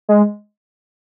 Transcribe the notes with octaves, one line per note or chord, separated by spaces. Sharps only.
G#3